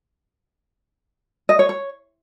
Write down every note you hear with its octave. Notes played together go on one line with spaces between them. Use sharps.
D#5
C#5
C#5